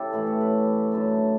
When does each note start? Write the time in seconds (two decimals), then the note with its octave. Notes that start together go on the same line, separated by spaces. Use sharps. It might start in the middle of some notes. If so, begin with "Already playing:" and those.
Already playing: C#3 E4 G4 A4
0.13 A2 E3 A3 B4
0.27 C#5
0.41 B4
0.92 F#2 D3 F#3 A3